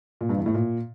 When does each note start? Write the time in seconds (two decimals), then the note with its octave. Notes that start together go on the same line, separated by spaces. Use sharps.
0.21 A#2
0.29 G2
0.37 E2
0.46 A2
0.54 A#2